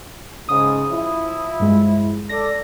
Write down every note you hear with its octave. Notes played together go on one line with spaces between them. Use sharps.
G#2 C#3 D#6
F3 E4
G2 G#3
A4 D5 A#6